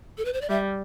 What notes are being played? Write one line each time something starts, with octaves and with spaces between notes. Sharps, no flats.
A4
B4
C5
D5
G3 E5